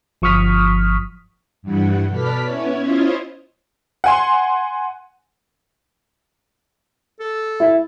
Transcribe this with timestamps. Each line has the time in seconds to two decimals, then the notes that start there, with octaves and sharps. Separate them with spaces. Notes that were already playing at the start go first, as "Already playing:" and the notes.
0.22 G1 F3 C#6 D#6 F6 B6
1.62 G2 E3 G3 F#5
2.08 B2 A4 B4 D5 F6 B6
2.43 B3 C#4 E4 C#5
2.80 C#4 E4 F4 C5 C#5 D#5
4.04 F#5 G#5 C6
7.20 A4
7.60 E4